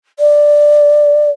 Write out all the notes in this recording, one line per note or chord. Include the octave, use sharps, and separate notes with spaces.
D5